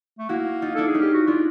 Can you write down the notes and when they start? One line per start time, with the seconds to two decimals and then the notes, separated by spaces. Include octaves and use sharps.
0.19 A3
0.29 A#3 E4 F#4
0.62 D#4 F4
0.75 D4 E4 A4
0.87 G#4
0.94 C#4 D#4
1.01 G4
1.14 F#4
1.27 D4 E4 F4